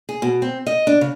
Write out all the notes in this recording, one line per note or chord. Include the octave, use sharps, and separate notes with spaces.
G#4
B2
C4
D#5
D4
C#3